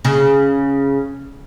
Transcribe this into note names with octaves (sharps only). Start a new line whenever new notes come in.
C#3